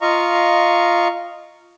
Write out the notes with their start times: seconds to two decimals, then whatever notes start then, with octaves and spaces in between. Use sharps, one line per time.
0.01 F4 D#5 F5 A#5 C#6